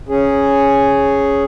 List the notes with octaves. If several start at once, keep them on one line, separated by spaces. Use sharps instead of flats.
C#4 G#4